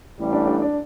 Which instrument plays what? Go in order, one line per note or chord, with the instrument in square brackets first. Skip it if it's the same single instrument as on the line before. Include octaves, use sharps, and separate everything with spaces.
[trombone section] A1 A2 G3
[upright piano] D4
D4
D4